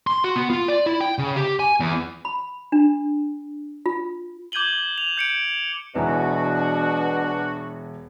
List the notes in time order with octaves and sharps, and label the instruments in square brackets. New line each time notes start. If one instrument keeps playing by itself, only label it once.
[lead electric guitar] C6
F#4
B3
F4
D5
E4
G5
C#3
G4
G#5
E2
[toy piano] B5
D4
F4
[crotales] D6 G6 G#6 D#7 F#7 G7
F7
G6 C#7 D7
[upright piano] E1 E3 [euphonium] B2 [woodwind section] D4 F#4 [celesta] B4 G#5 A#5